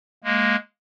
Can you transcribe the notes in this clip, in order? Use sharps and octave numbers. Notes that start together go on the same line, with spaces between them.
G#3 A#3